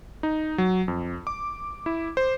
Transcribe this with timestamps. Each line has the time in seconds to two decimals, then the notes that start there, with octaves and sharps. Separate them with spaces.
0.23 D#4
0.58 F#3
0.88 F2
1.27 D6
1.86 E4
2.17 C5